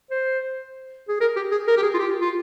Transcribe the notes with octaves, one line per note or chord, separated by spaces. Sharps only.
C5
G#4
A#4
G4
G#4
A#4
G4
G#4
F4
G4
F4